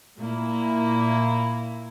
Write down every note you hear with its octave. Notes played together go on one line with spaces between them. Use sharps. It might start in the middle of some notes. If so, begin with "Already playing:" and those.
A#2 A#3 E4